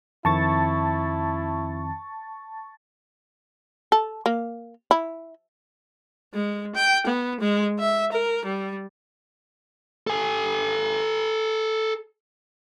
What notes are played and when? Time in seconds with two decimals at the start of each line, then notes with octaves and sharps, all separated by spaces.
0.25 F2 D#3 C4 E4 A5 C#6 A6
3.92 A4
4.26 A#3
4.91 E4
6.34 G#3
6.75 G5
7.06 B3
7.40 G#3
7.79 E5
8.12 A#4
8.45 G3
10.07 A4 G#5